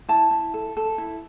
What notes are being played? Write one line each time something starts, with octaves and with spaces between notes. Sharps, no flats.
E4 A5
E4
A4
A4
E4